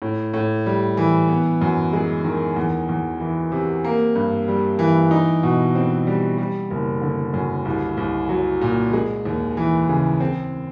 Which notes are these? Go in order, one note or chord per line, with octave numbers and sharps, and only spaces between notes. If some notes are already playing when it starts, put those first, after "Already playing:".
A2
A2
G3
E3
B3
F#2
G#3
D#3
E2
E2
E3
C3
A#3
G2
G3
E3
D#4
B2
C4
G3
G3
F#1
D3
F#2
C2
C2
F#3
A#2
G#3
D#2
E3
C#3
C4